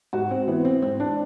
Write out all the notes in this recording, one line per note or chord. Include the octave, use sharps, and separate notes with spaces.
G#2 F#4
C4
E3 B3
C4
G#2 C4
D4